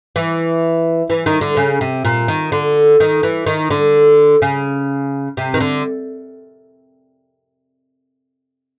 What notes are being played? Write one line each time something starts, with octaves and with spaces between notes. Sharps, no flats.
E3
E3
D#3
D3
C#3
C3
A#2
D#3
D3
D#3
E3
D#3
D3
C#3
C3
D#3
D3